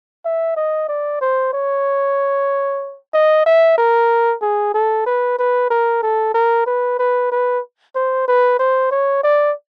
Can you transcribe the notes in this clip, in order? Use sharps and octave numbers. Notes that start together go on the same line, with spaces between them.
E5
D#5
D5
C5
C#5
D#5
E5
A#4
G#4
A4
B4
B4
A#4
A4
A#4
B4
B4
B4
C5
B4
C5
C#5
D5